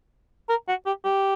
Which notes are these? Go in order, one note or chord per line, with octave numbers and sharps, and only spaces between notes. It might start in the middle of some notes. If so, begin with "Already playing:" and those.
A#4
F#4
G4
G4